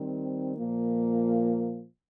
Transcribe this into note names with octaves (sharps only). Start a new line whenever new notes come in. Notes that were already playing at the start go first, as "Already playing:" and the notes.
Already playing: D#3 G3 C4
A#2 F3 A#3